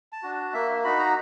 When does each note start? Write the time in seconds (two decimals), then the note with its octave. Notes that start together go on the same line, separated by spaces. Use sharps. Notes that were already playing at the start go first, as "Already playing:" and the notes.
0.13 A5
0.23 D4 F#4
0.53 A#3 E5
0.84 D#4 F#4 B5
0.99 A#5